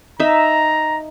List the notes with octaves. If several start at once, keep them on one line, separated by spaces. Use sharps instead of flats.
D#4 E5 A#5